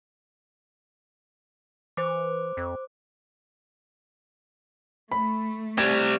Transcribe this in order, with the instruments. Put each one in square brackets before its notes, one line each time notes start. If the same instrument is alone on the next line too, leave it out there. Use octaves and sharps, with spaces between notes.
[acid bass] E3 [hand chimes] C5 D6
[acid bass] F2
[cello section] A3 [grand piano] B5
[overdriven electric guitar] G3 C4 [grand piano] G#6